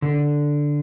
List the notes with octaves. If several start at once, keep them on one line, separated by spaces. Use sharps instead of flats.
D3